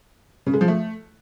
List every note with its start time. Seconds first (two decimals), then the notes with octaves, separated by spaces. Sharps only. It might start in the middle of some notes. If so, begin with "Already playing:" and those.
0.46 C#3
0.54 G#3
0.61 F3
0.68 A3